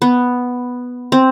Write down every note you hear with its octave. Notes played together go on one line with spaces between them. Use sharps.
B3
C4